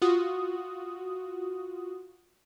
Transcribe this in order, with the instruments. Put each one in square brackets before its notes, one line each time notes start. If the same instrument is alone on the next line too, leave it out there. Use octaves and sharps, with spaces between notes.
[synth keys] F4 F#4 D#6